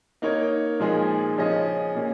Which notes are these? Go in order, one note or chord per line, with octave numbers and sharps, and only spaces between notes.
A#3 D#4 A#4 C#5
A#2 F3 G#3 D#4 G#4
C#3 F3 C#4 G#4 D#5
A#2 A#3 C#4